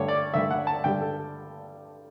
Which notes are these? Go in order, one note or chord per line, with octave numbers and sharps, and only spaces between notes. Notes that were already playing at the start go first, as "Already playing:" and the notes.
Already playing: G2 D3 A3 C#5
D5
G2 D3 A3 E5
F#5
A5
G2 D3 G3 G5
A4